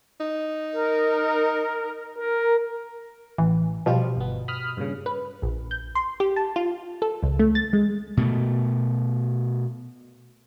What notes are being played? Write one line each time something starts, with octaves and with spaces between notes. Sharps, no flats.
D#4
A#4
A#4
A1 E3
B2 F3 G3 F4
G1 B3
B5 D#6 F6
G2 A#2 C#3
B4
A#1
G6
C6
G4
A5
F4
A4
C#2
A3
A6
G#3
B2 A3